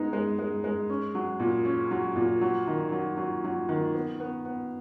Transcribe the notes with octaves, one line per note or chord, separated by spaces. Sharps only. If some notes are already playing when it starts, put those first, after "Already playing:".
Already playing: G#3 B3 D#4
G#3
G#3
G#3
C#4
F#3
A#2
C#4
F#3
A#2
F#3
D#3
F#3
F#3
F#3
D#3
B3
B3
B3